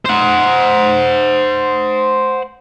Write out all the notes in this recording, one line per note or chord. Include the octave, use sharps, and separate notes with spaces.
C5 F#5